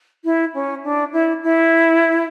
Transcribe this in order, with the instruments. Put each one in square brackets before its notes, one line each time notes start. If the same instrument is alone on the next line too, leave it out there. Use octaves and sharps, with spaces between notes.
[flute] E4
C#4
D4
E4
E4